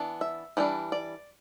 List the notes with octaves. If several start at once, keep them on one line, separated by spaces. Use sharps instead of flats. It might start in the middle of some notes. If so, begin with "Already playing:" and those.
Already playing: E3 B3 D4
E5
E3 G3 B3 D4
D5